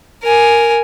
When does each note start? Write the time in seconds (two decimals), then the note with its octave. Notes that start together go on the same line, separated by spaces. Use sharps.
0.23 A#4 G#5